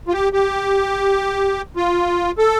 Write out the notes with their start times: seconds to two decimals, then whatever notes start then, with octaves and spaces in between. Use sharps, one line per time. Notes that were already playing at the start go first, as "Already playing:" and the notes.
0.08 F4
0.13 G4
0.33 G4
1.76 F4
2.38 A4